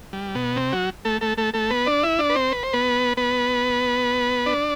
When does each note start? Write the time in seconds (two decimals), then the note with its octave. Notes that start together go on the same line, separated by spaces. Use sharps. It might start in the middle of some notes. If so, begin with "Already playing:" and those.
0.13 G3
0.35 B2 B3
0.56 C3 C4
0.72 F#3 F#4
1.05 A3 A4
1.21 A3 A4
1.37 A3 A4
1.54 A3 A4
1.70 B3 B4
1.86 D4 D5
2.03 E4 E5
2.19 D4 D5
2.30 B4
2.36 C4 C5
2.52 B4
2.63 C5
2.73 B3 B4
3.17 B3 B4
4.46 D4 D5